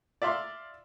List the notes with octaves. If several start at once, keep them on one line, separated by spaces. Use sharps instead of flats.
D5 E5 F5 C6